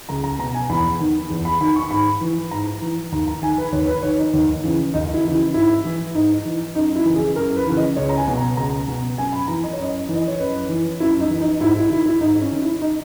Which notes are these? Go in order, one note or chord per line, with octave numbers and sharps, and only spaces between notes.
C#2 A#5
A#5
B2 A#5
G#5
E2 B5
D#3
E2
B5
D#3 B5
C#6
G#2 B5
E3
G#2 A#5
E3
D#2 A#5
A#5
D#3 G#5
B4
D#2 C#5
B4
D#3 C#5
D#4
D#2
C#3 E3
D#2 D#4
E4
C#3 E3
E4
G#2 E4
E3
G#2 D#4
E3
F#2 D#4
E4
C#3 E3
G#4
F#2 A#4
B4
C#3 E3
D#5
C#2 C#5
A#5
G#5
B2
A#5
C#2 A#5
B2
F#2 G#5
B5
E3 A#5
D#5
C#5
F#2 D#5
E3
D#5
C#5
F#2 B4
E3
F#2 E4
D#4
E3
D#4
G#2 E4
E4
D#3 E4
E4
G#2 D#4
C#4
D#3
E4
D#4